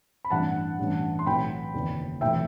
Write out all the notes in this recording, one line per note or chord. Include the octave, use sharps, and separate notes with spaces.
B5
A1 G2 E3 F#5 A5
A1 G2 E3
C6
B1 A2 E3 G5 B5
F#1 E2 D#3
B1 A2 E3 E5 G5